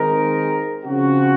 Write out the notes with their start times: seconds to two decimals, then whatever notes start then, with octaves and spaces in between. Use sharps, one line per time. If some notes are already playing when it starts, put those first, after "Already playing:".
Already playing: D#3 G#3 C4 D#4 A#4
0.85 C#3 F3 C4 F#4